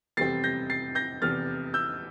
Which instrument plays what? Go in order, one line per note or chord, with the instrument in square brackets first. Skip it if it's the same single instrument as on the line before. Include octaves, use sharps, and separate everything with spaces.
[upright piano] F1 E2 C3 G3 C4 [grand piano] A6 C7
[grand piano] G6 A#6
A6 C7
G6 A#6
[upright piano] F1 E2 C3 [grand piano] F6 A6
[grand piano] E6 G6